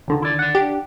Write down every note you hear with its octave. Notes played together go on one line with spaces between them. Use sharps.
C#2 D3 D#3
E4 D5
D5 F#5
D4 G4